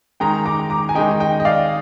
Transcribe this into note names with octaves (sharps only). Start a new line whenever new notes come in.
D#3 G#3 D#4 G5 A#5
A#5 D6
A#5 D6
G#5
D#3 G#3 D#4 D#5 G5
D#5 G5
D#5
D5 F5